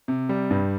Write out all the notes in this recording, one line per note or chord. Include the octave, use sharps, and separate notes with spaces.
C3
G3
G2